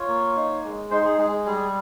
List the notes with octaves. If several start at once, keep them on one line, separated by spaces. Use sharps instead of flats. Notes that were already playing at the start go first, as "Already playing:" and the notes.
Already playing: F4 C#5
A#3
D#4
G#3
D#4 C5
G#4
G#3 G#4
G3 G#4